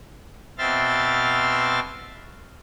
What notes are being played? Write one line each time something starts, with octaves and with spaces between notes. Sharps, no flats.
B2 C4 E5 C6 F6 A6